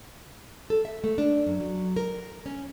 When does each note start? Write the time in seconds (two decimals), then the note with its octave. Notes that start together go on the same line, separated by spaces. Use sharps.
0.70 A4
0.85 E5
1.04 A3
1.18 D4
1.47 F#2
1.60 F#3
1.96 A#4
2.46 C#4